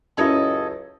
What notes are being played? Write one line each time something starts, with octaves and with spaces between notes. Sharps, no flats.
C#2 F#2 F#3 E4 A4 C#5 D#5